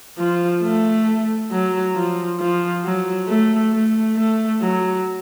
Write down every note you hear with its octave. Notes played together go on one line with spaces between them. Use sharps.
F3
A3
F#3
F3
F3
F#3
A3
A3
A3
F#3